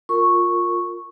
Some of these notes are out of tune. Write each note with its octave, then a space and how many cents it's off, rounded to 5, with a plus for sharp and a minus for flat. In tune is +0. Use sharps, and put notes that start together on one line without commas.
F4 +15 A#4 -15 C#6 -5